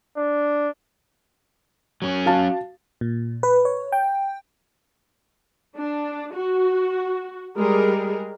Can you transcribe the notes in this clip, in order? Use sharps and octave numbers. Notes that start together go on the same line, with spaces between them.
D4
F#3 C#4
F#4 F5 A5
A#2
B4
C#5
G5
D4
F#4
G3 G#3 G#4 A#4